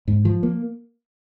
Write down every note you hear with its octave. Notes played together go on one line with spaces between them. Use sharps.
G#2
F3
A#3